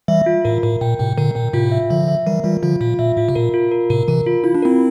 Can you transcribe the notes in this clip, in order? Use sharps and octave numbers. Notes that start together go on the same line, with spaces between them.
E3 G3 E5
F4
A2 A#4
A2 A#4
A#2 G5
A2 C3 G5
A#2 D3 A#4
A#2 G5
A2 C3 F4
E5
D3 F3 E5
E5
E3 G3 A#4
E3 G3 F4
D3 F3 F4
A#2 F4
A#2 E5
A2 F4
C3
A#2 A#4
F4
A#4
A2 C3 A#4
C3 E3 A#4
F4
E4 F4
D4
C4 E4 A#4